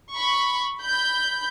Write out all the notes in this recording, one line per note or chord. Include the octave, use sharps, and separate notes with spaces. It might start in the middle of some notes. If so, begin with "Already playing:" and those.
B5 C#6
B5 G6